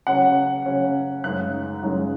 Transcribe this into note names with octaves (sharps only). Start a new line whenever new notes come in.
C#3 F#3 C#4 F#5
C#3 F#3 C#4
F#2 C#3 G#3 D#4 F#6
F#2 C#3 G#3 D#4